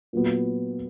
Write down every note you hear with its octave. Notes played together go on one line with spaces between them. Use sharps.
A#2 F#3 B3